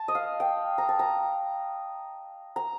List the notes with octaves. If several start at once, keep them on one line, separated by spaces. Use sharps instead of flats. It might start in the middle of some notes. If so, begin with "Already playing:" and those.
Already playing: A5
D#5
F5
G5
A#5
A5
A#5
A#5